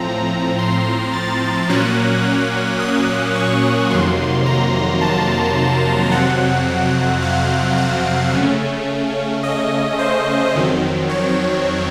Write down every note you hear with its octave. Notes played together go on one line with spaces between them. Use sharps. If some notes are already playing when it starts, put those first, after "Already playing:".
Already playing: A2 F3 C4 A#5
C6
A6
A#2 F#3 A#3 C#4 F#6
D#6
C#6
F2 C3 D#3 F#3 A#3 C6
A#5
A5
F2 C3 F#3 C4 F#5
F5
F5
C#3 A3 C#4
D#5
C5
F2 D#3 F#3 C4
C#5